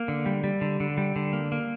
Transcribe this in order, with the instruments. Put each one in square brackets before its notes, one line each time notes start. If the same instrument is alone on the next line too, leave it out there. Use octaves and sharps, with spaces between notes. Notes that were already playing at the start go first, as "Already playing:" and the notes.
Already playing: [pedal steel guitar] A#3
D3
G3
G3
D3
D3
G3
D3
A#3
A#3